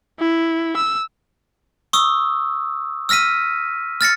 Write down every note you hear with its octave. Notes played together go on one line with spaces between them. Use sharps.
E4
E6
C#6 D#6 E6
E6 F6 A#6 B6 D#7
F6 A6 A#6 C#7